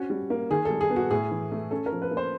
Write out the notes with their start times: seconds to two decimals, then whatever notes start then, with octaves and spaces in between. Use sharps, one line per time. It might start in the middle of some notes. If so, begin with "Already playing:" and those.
Already playing: C4 C#4 F#4
0.10 G3
0.30 A#3
0.50 D#3 G#4
0.65 A4
0.71 G3
0.81 G#4
0.90 B3
0.96 F#4
1.10 A2 G#4
1.31 E3
1.52 A3
1.71 C#4 A4
1.86 A#4
1.92 F3
2.02 B4
2.11 A#3
2.17 C5